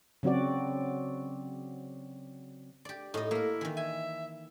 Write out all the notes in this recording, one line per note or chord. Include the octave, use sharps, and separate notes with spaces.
C#3 F#3 C4 F#4 D5
G4 D5
A2 D#4 D#5
A#3 E4 A#4
D#3 E3
E5 G#5